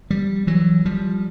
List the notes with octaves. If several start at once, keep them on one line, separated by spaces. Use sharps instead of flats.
F3 G3
E3 F#3
F3 G3